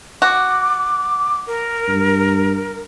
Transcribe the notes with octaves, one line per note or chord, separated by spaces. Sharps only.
F#4 D6
A#4
G2